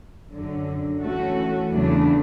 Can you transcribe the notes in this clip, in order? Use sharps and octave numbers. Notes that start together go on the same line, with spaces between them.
F#2 D3 F#3
E3 A3 C#4 F#4 A4
E2 C#3 F#3 A3 D4